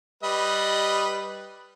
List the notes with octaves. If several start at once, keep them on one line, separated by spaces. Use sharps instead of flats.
G3 B4 D#5